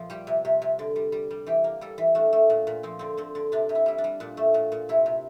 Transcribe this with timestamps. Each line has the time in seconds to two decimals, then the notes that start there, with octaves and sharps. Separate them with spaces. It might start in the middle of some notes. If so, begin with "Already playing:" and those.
Already playing: A#2 F3
0.10 G3 G4
0.27 C3
0.45 C3
0.62 C3
0.79 D3
0.96 G3
1.12 G3
1.31 G3
1.46 E3 G4
1.64 A#3
1.81 G3 A4
1.98 E3
2.15 A3 D4
2.33 A3
2.50 A#2
2.67 A#2
2.83 F3 C4
2.99 D3 C4
3.17 D3 C4
3.35 D3
3.52 C3 D4
3.69 C3
3.75 E4
3.86 G3 E4
3.98 D4
4.04 G3
4.20 A#2 D4
4.37 A3
4.54 A#2
4.72 A#2
4.89 C3 E4
5.06 C3